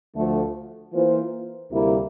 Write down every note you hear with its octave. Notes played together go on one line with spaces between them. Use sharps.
D2 D3 F3 A3
E3 A#3 F4 C5
D2 C3 G3 A#3 E4